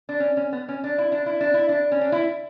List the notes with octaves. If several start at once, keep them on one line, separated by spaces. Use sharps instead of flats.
D4
C#4
C#4
B3
C#4
D4
E4
D4
E4
D4
E4
D4
C#4
D4
E4